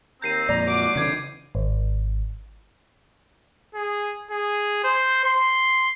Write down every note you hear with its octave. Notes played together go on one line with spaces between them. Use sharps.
D#2 C4 A#5 G6 C7 D#7
F2 A#2 D5 A#5
F#3 D6
C#3 E3 G#6 C7
G#1
G#4
G#4
C5
C6